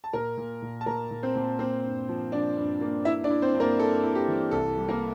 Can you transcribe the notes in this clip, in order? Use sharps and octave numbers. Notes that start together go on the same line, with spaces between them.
A5
A#2 A#4 A#5
A#2
A#2
A5
A#2 A#4 A#5
A#2
C4 C5
A#2
A#3 C4 C5
G2
F3
F3 D4 D5
G2
A#3
E4 E5
D4 D5
E4
C4 C5
G2
A#3 A#4
E4 A4
E4
G4
E3
C2 A4
G3
A#3 A#4